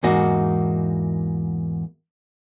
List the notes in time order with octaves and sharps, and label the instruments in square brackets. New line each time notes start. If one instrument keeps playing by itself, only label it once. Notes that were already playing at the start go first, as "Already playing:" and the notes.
[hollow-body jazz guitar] E2 G#2 A#3 D#4 F#4